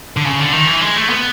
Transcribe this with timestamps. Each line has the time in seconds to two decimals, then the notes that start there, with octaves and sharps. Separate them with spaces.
0.17 D3
0.25 C#3
0.39 D3
0.53 D#3
0.67 E3
0.81 G#3
0.96 A3
1.10 B3